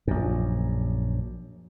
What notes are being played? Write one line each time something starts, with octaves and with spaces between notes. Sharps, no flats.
A#1 F#2